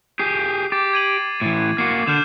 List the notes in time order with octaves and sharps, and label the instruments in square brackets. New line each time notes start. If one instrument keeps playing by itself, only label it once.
[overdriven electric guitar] G4 G#4 [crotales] C7
[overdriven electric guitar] G4 [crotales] D6 A6
[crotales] G#6 D#7 F#7
[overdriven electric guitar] A2 E3
[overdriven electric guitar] A#3 F#4 [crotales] C7
[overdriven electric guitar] D3 [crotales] F6 G6 E7